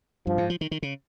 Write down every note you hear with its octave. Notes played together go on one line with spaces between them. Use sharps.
G2 F3
G#2
F3
D#3
D#3
C#3